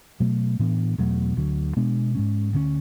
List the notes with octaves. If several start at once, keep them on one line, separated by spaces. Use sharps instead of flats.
B2 F#3 A3
A2 E3 B3 D4
E2 B2 F#3 A3
D2 D3 F#3
B2 G#3 B3 D4
G#2 G#3 C#4
D2 D3 G#3 C#4